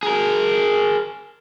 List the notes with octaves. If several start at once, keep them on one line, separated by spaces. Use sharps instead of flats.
G#4 A#4